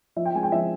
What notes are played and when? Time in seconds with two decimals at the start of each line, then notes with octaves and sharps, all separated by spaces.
0.16 F3 E5
0.25 G5
0.35 G#3 C4 G#5
0.43 G5
0.52 F3 E5